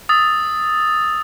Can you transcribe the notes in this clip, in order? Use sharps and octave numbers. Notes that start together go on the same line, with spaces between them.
D#6 E6 A6